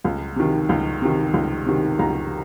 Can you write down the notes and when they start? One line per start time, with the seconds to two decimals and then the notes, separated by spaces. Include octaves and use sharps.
0.04 C#2
0.36 C3 D#3
0.69 C#2
1.02 C3 D#3
1.34 C#2
1.66 C3 D#3
1.99 C#2 A#5